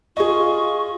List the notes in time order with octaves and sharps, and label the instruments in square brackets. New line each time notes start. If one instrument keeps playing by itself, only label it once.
[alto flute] F4 [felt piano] G#4 D#5 [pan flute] C#6